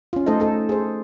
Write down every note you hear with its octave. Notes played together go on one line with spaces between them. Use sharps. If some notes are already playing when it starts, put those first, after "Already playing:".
C#4 F4
A3 D#4 A4 C5 D#5
D#4 A4
G#4 C5